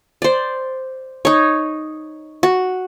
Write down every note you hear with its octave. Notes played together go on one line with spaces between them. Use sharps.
C5 D5
D#4 C#5
F#4